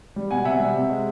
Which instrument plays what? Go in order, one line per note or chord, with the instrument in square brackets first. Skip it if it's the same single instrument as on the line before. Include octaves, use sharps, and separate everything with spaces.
[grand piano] G3
B2 F#5 G#5
C3 E5 F#5
G3
C3
G#3